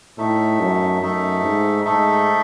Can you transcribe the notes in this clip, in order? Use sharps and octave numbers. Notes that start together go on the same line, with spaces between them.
A2 A3 D#4 A4 E5
F#2
F#2 A3 D#4 A4 E5
G#2
G#2 A3 D#4 A4 E5